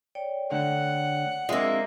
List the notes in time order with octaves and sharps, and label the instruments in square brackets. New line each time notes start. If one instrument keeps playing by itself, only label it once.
[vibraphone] C#5 D5 G5
[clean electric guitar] D3 A3 D4 [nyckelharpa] F#5
[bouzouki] G#3 A#3 [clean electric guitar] C4 D4 F4 [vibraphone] E5 E6